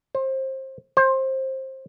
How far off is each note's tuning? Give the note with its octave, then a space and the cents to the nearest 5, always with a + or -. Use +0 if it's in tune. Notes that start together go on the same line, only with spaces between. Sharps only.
C5 +25
C5 +20